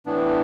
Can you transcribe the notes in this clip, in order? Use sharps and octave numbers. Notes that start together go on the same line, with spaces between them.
A2 E3 B3 D4